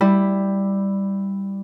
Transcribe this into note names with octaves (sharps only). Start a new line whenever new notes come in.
G3 E4